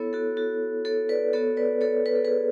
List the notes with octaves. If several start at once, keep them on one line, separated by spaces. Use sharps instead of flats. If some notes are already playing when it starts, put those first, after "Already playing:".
Already playing: B3 E4 A4 C#5
F#4 A4
F#4 A4
A4 C#5
B4 D5
B3 F#4 A4 C#5
B4 D5
A4 C#5
B4
A4
G#4 B4